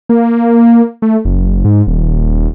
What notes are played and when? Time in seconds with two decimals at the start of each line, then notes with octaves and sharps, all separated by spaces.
0.09 A#3
1.02 A3
1.25 F#1
1.65 G#2
1.87 D#1